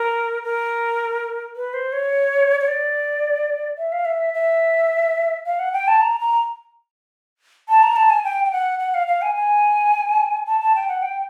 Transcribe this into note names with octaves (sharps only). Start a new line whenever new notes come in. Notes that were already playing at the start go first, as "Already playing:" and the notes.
Already playing: A#4
A#4
B4
C5
C#5
C#5
D5
E5
F5
E5
E5
F5
F#5
G5
A5
A#5
A#5
A5
A#5
A5
G#5
G5
G5
F#5
F#5
F5
F5
G#5
G#5
A5
A5
G5
F#5
G5